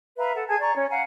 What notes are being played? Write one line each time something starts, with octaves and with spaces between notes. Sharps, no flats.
B4 E5 F5 A#5
A4 F#5
G#4 G#5 A5 G#6
D5 A#5 C#6
C#4 C#5
F5 F#5 G#5 A#5